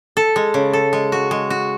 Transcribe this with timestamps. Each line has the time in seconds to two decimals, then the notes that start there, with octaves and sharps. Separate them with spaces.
0.17 A4
0.36 G#3
0.54 C#3
0.73 A4
0.93 G#3
1.12 F#4
1.31 G#3
1.50 F#4